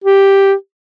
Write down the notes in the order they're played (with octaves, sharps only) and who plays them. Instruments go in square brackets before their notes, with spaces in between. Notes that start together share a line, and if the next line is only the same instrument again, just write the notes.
[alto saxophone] G4